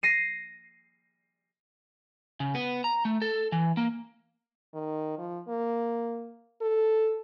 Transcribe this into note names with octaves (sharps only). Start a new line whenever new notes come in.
A#6 C7 D#7
C#3
B3
A#5
A3
A4
E3
A#3
D#3
F3
A#3
A4